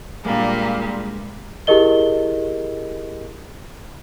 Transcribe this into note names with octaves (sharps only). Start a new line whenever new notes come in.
A#2 G3 G#3 A#3 D4
E4 G4 G#4 A#4 D#5 G7